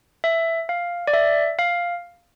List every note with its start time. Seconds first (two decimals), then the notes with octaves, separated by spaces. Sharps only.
0.24 E5
0.69 F5
1.07 D5
1.14 E5
1.59 F5